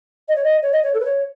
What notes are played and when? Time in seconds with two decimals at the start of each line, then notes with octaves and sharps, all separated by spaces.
0.28 D#5
0.35 C#5
0.44 D#5
0.62 C#5
0.72 D#5
0.83 C#5
0.94 A4
1.00 B4
1.05 C#5